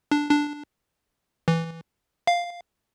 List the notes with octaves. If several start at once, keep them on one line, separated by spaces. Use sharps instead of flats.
D4
D4
E3
F5